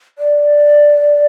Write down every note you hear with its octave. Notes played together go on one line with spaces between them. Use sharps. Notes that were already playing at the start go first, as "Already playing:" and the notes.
D5